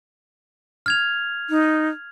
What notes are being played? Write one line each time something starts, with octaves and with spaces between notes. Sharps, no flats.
F6 G#6 F7
D#4